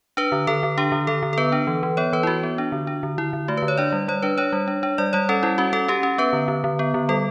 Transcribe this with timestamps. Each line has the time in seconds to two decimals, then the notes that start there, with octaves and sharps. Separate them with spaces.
0.17 D4 B4
0.32 D3
0.47 D3 A4
0.63 D3
0.78 D4 G4
0.92 D3
1.07 D3 A4
1.23 D3
1.33 A4
1.38 B3 B4
1.52 D4
1.67 E3
1.83 E3
1.97 B3 C#5
2.13 E3 B4
2.23 E4
2.27 E3 F#4
2.43 B3
2.58 D4
2.72 D3
2.87 D4
3.03 D3
3.18 D3 E4
3.33 D3
3.48 A3 F#4
3.57 D3 B4
3.68 C#5
3.77 D4 D5
3.92 G3
4.08 G3 C#5
4.23 D4 B4
4.38 D4 C#5
4.53 G3
4.68 D4
4.83 D4
4.98 G3 D5
5.13 G3 C#5
5.29 C#4 A4
5.43 G3 E4
5.58 C#4 F#4
5.73 C#4 A4
5.88 C#4 G4
6.03 C#4
6.18 B3 B4
6.33 D3
6.48 D3
6.64 D3
6.79 B3
6.94 D3
7.09 G3 A4